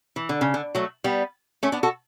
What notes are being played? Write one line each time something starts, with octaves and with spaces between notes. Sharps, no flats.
E3
D3
C#3
D3
F#3 A3
G3 B3
A3 C#4
B3 D4
F#4 A4